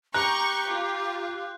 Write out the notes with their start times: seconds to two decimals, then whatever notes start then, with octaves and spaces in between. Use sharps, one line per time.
0.14 G4 A#5 C#6 F#6 G6
0.71 F4